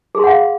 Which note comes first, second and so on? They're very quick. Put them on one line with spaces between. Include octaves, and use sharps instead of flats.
G#4 C6 F#5 F5